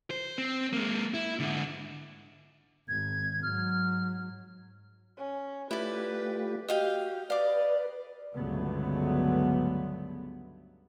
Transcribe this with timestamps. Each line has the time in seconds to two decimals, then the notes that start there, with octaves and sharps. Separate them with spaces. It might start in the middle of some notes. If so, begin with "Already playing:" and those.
0.10 C5
0.38 C4
0.73 G#3 A#3
1.14 E4
1.39 G#2 D3
2.88 G#1 G#6
3.43 G#2 F#3 F6
5.17 C#4
5.71 A3 E4 F4 G4 B4 D5
6.68 F#4 G4 D#5 F5 G5
7.30 B4 D5 D#5 F5 D6
8.35 C#2 G2 D3 F#3 A3 B3